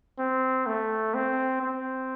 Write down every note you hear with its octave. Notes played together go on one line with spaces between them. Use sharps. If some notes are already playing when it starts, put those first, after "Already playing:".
C4
A3
C4
C4